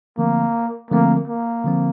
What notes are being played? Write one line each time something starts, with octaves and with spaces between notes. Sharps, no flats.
D3 F3 A3 A#3 C4
D3 F3 A3 A#3 C4
A#3
D3 F3 C4